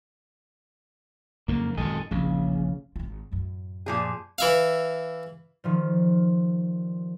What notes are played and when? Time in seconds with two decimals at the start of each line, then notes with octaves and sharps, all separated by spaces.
1.48 F#1 F2 G#2 A#3
1.77 G#1 F#2 A#2 A4 D#5 G#5
2.11 F1 A#1 E2 C#3
2.96 G#1 F4
3.32 F#2 A2
3.86 A#2 F3 G#4
4.38 E3 E5 F5
5.64 D#3 F3 G3